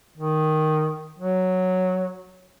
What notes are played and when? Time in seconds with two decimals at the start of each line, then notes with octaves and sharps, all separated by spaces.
0.18 D#3
1.19 F#3